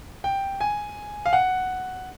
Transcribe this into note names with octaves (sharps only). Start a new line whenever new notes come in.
G5
G#5
F5
F#5